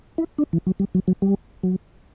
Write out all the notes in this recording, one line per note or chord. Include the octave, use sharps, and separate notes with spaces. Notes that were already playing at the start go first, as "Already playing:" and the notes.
E4
D4
E3
F#3
G3
F#3
F#3
G3
F#3